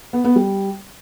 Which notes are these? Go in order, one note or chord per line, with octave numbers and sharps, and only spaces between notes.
B3
B3
G3